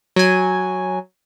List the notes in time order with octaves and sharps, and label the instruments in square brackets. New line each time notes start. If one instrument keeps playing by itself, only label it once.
[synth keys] F#3 G#5